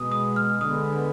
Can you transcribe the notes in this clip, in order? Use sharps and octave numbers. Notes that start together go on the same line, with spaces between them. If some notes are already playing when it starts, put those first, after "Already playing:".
Already playing: B2 G#3 B3 D#6
D#6
F6
D3 G#3 B3 D#6